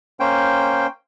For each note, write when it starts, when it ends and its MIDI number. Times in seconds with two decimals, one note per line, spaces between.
0.20 0.87 58
0.20 0.87 61
0.20 0.87 72
0.20 0.87 79